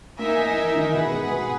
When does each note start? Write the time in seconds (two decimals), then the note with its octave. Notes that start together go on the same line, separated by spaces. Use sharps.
0.19 A#3 D#4 A#4 E5 G#5
0.38 E3
0.57 E3
0.75 D#3
0.94 B2 G#4 B4 F#5
1.13 G#2
1.31 B2